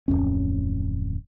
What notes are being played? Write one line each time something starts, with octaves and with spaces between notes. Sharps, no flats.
D1 G#1 F2 C#4